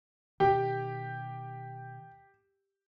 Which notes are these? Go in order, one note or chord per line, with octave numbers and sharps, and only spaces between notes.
B2 D#3 G4 G5